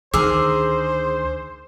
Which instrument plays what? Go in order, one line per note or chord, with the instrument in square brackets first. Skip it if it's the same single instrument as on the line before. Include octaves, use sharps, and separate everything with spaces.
[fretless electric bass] D2 D3 D#3 [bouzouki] G#4 A#4 [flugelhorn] C5 [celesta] D6 E6